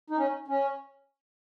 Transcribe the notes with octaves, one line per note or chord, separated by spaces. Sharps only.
D#4
C#4
C#4